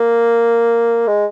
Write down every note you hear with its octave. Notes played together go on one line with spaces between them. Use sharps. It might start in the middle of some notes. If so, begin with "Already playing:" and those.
Already playing: A#3
G#3